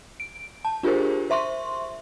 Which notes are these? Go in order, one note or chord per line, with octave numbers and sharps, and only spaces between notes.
D7
A5
D4 F4 G4 G#4 A#4 C5
C5 E5 C6 C#6